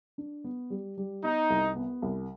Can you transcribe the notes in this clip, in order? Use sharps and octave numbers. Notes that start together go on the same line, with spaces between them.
D4
B3
G3
G3
B3 D#4
C2
B3
C2